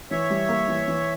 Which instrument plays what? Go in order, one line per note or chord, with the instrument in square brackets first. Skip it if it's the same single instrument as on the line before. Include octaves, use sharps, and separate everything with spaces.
[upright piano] E3 [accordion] C#5 E5
[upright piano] G3
A#3
E3
E3